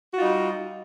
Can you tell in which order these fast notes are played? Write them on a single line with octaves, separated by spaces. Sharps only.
F#4 F4 D#4 G3